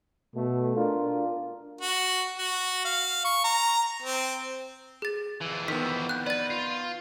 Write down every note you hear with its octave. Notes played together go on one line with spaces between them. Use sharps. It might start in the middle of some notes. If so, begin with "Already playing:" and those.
B2 A3
D4 F4 A#4
F#4
F#4
F5
C#6
A#5
C4
G#4 A6
F2 E3
D#3 B3 E6 B6
F#6 G6
B4 D5 A6
F4